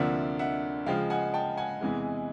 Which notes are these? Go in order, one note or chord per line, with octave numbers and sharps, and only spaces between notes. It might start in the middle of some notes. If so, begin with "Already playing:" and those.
Already playing: D2 C3 F3 A#3 D4 E5 F#5
E5 F#5
C#3 F3 G#3 F5 G5
F#5 G#5
G5 A5
F#5 G#5
E2 C3 E3 G#3